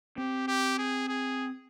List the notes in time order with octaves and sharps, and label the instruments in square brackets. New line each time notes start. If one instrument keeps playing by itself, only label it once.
[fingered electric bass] C4 [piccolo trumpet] G4
[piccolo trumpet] G4
G#4
G#4